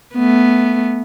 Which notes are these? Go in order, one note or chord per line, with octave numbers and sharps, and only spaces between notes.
A3 B3